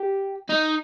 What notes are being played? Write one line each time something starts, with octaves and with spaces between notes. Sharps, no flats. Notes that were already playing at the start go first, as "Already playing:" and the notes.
Already playing: G4
D#4